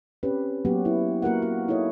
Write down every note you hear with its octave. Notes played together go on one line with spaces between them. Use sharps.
C4 C#4 G4 B4
F#3 A#3 B3 F#4 G4
E4
A#3 F#4 A#4 F#5
F#4
D#4 E4 A4 C#5 D#5